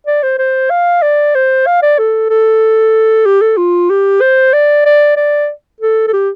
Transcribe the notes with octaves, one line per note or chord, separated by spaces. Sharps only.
D5
C5
C5
F5
D5
C5
F5
D5
A4
A4
G4
A4
F4
G4
C5
D5
D5
D5
A4
A4
G4